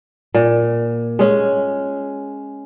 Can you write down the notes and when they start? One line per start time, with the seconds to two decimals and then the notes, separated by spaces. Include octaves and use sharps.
0.34 A#2
1.19 G#3 C#4